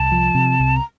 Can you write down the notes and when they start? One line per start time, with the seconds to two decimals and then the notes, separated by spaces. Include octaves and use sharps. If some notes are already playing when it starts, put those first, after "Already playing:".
Already playing: C2 A5
0.12 F3
0.35 C3
0.60 C2
0.76 A#5